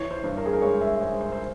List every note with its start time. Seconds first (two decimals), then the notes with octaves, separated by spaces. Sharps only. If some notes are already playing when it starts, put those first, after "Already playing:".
Already playing: E3 C#5
0.11 C5
0.24 G2
0.37 A#4
0.46 G#4
0.53 A#4
0.62 G#3 C#5
0.81 E5
1.01 G#3 C5
1.21 C5
1.32 C5